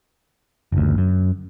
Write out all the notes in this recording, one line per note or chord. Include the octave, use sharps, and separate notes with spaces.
F#1 D2
F#2